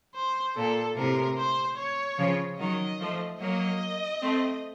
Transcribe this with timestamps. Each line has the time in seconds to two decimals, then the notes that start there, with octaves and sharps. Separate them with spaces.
0.15 C5
0.56 A#2 A4
0.96 A2 C3 A#4
1.37 C5
1.77 C#5
2.18 C#3 F3
2.59 D#3 F#3 D#5
3.00 F3 A3
3.40 F#3 A#3 D#5
4.21 A3 C4